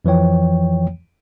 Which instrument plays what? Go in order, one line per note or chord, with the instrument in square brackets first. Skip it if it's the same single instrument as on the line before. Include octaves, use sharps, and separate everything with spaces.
[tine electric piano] F2 E3 F3 C#5 G5